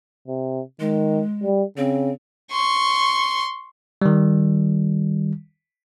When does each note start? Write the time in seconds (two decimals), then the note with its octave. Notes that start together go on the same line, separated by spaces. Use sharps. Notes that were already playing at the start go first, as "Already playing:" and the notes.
0.28 C3
0.80 D#3 G#3
1.43 G3
1.77 C#3 C4
2.52 C6 C#6
4.02 D#3 G3